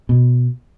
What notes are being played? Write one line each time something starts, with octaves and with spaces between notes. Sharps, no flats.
B2